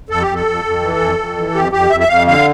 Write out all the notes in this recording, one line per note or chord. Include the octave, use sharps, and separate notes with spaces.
F2 A4
G4
F2
A4
F2
F2
E3
F2
F2
E3
F2 G4
F2 G4
F2 E5
E5
F2 F5
D3 F5